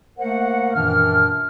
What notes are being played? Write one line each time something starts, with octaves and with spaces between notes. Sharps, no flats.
A3 A#3 A#4 C5 F#5
F#2 A#2 D#3 E3 D4 F6